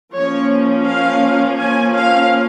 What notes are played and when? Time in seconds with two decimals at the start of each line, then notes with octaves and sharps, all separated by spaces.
0.15 F3 A#3 C#4 C#5
0.87 F5
1.59 G#5
1.94 F5